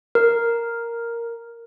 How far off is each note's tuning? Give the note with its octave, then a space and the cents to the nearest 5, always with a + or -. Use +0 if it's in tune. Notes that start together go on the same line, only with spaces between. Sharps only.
A#4 +0